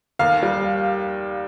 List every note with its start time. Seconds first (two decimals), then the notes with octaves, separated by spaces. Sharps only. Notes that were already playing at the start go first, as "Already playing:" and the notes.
0.19 D#2 F5
0.43 G3